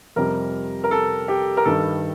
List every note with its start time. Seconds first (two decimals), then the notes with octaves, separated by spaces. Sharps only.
0.16 F2 C3 G3 A#4
0.84 A#4
0.91 A4
1.28 G4
1.57 A#4
1.65 G2 D#3 G3 A4